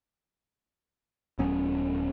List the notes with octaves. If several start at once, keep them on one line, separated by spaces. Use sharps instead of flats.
D#1 F#3 B3 C#4